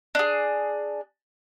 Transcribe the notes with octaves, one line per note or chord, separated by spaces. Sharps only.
D4 G#4